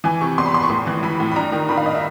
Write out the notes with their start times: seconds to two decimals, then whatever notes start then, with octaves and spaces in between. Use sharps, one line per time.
0.04 E3 G#5
0.21 C3 C#6
0.38 E2 C6
0.46 B5
0.54 E2 C6
0.63 C#6
0.70 A2 C6
0.87 E3
1.03 E3 B5
1.20 A2
1.31 B5
1.36 G2 A#5
1.52 D#3
1.69 D#3 B5
1.77 F5
1.86 D#5
1.95 E5